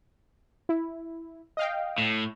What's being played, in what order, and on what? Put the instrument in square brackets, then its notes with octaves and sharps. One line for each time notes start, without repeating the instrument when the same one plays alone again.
[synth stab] E4
D#5 F5 G5
[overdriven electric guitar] A2